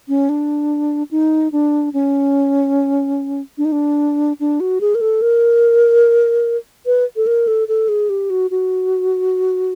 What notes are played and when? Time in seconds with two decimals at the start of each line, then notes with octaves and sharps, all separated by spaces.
0.08 C#4
0.29 D4
1.11 D#4
1.52 D4
1.94 C#4
3.58 D4
3.65 D#4
3.72 D4
4.40 D4
4.60 F#4
4.81 G#4
4.95 A#4
5.01 A4
5.22 A#4
6.86 B4
7.16 A4
7.27 A#4
7.47 A4
7.68 A4
7.89 G#4
8.10 G4
8.30 F#4
8.51 F#4